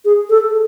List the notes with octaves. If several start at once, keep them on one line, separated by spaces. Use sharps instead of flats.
G#4
A4